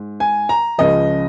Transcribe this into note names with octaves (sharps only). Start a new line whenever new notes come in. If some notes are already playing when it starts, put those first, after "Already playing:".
Already playing: G#2
G#5
A#5
C#2 C#3 F3 D#5